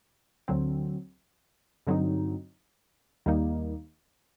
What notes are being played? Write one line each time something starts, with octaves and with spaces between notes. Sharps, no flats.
D2 D3 F#3 C4
G2 D3 F#3 C4 D#4
D#2 D#3 G3 A#3 D#4